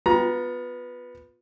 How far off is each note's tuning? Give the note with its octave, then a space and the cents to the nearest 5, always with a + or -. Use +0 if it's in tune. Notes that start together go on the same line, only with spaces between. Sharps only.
B3 +0 F4 +30 A#5 +20